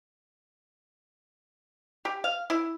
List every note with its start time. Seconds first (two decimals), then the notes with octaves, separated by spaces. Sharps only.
2.05 G4
2.24 F5
2.50 E4